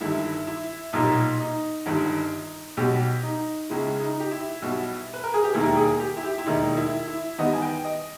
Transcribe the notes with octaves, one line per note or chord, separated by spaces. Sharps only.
G1 G2 D#3 E4
E4
B1 A#2 G3 A#3 D#4
D#4
G1 G2 D#3
B1 B2 G3 G4
D#4
C#2 C#3 G#3 E4
D#4
G4
E4
B1 B2 G3
B4
A#4
G#4
G4
E1 D#2 D#3 G3 A#3 E4
G#4
G4
E4
G4
E4
E1 D#2 D#3 D#4
E4
E4
E2 D#3 G3 B3 D#5
G#5
G5
D#5